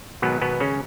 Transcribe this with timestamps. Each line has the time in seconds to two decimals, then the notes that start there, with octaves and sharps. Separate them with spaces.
0.22 G#2 B2 D#3 F#3 B3
0.41 B2 B3
0.60 C#3 C#4